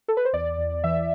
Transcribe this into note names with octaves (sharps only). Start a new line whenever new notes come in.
A4
B4
C5
E2 D5
E2
E3 E5